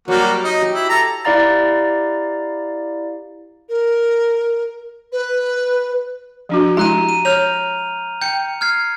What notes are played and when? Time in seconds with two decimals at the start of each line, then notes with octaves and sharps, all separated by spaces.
0.08 F#3 G3 A#3 F#4
0.44 D#4
0.62 G4
0.74 E4
0.89 A4 A#5
1.25 E4 G4 D5 F5 A#5 A6
3.68 A#4
5.12 B4
6.49 F3 D4 F#4
6.77 G#3 E4 G4 A#5 F#6 D#7
7.09 D#7
7.25 C#5 F6 G6 F7
8.22 G5 G6 C#7
8.61 F6 G#6 C7